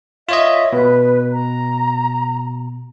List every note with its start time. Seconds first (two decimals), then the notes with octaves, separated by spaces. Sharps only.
0.29 F4 C#5 D#5 E5
0.73 B2 B4
1.33 A#5